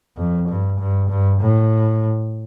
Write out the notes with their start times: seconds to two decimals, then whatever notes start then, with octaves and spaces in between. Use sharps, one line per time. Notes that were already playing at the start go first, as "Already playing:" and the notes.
0.17 F2
0.48 G2
0.79 G2
1.09 G2
1.40 A2